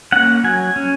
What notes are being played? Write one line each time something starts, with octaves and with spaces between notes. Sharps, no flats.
A#3 C#4 F#5
F#3 G#5
C#4